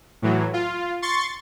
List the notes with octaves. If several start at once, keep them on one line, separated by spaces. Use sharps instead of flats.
A2 E3 F#3
F4
C6 C#6 A6